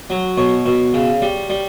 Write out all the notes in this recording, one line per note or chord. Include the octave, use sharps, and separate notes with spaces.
F#3
B2 C#5
B2
C#3
G3
G3